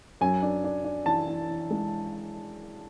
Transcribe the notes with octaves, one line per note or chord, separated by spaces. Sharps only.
F#2 G#5
D4
D4
D4
E3 A5
E3
E3
G#3